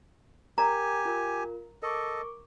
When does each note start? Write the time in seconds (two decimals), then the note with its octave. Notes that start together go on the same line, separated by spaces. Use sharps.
0.58 G4 A#4 G#5 A#5
1.05 F4 A#4
1.83 A4 A#4 D#5 C#6 D6